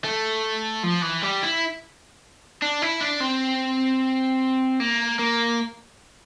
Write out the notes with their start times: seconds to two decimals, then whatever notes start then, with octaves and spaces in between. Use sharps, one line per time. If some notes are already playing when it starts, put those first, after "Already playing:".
0.04 A3
0.84 F3
1.03 E3
1.23 G3
1.43 E4
2.62 D4
2.82 E4
3.01 D4
3.20 C4
4.80 A#3
5.19 A#3